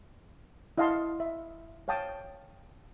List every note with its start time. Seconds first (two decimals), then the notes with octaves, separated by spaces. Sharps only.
0.78 E4 D#5 F5 F#5 A5 C6
1.20 E5
1.88 C#5 F5 G5 A5 D#6